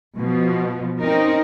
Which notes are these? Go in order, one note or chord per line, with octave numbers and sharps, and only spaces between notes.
B2 F3
C4 C#4 D#4 A#4